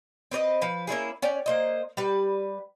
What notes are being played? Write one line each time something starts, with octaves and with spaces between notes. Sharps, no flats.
C4 B4 C#5 D#5
F3 B4
A#3 C#4 E4 G#4
C#4 C#5 D5 G5
A#3 C5 D#5
G3 B4